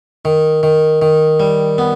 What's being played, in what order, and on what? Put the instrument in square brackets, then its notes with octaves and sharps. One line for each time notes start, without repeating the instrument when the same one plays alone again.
[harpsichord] D#3
D#3
D#3
G3
B3